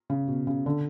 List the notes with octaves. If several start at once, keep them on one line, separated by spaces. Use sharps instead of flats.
C#3
B2
C#3
D3